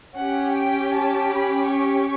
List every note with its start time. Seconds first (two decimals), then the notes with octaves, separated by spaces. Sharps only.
0.17 C#4 G4 F#5
0.57 G5
0.96 A5
1.35 B5
1.74 C#6